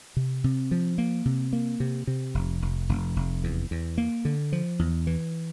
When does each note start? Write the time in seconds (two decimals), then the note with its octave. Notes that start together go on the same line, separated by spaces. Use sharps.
0.17 C3
0.44 C3
0.71 F3
0.98 A#3
1.25 C3
1.53 A#3
1.80 C3
2.07 C3
2.34 F1
2.62 F1
2.89 F1
3.16 F1
3.44 E2
3.71 E2
3.98 A#3
4.25 D3
4.52 F3
4.79 E2
5.07 E3